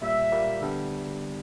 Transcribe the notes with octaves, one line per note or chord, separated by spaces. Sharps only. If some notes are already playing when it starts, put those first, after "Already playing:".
A#2 G3 A#3 E5
A#2 G3 A#3
D3 G3 B3 D4